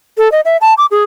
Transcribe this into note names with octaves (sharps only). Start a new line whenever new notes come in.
A4
D#5
E5
A5
D6
G#4